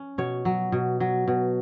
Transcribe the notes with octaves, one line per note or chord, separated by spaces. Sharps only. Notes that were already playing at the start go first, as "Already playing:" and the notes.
Already playing: C#4
B2 C#5
F#3
B2
F#3
B2